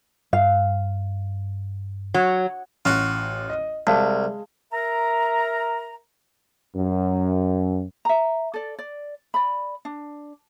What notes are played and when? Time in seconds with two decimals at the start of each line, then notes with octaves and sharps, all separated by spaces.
0.33 G2 F5
2.14 F#3
2.85 A1 F4 F#4 F#5
3.50 D#5
3.87 C2 G#3 F5 A5
4.73 A#4 E5 A#5
6.75 F#2
8.05 E5 A#5
8.54 A4 D5
8.79 D5
9.34 D5 B5
9.85 D4